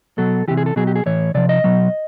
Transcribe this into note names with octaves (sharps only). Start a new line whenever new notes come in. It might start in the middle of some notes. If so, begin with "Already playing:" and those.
B2 F#3 A4
C3 E3 G4
G#4
A4
B2 F#3 G#4
G4
G#4
A2 E3 C#5
C3 F3 D5
D#5
B2 F#3